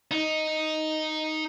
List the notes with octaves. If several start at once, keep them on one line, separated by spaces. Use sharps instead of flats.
D#4